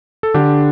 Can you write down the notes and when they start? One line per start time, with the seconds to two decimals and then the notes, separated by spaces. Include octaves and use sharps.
0.23 A4
0.34 D3 D4 G4